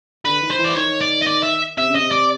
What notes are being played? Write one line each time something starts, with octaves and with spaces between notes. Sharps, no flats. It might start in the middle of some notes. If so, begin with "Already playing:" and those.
D3 B4
D#3
C5
E3
D5
D#3 C#5
D5
D#5
D5
E5
C3 E5
C#3
C3 D#5
D5